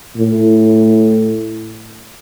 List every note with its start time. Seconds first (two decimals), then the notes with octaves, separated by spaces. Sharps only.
0.17 A2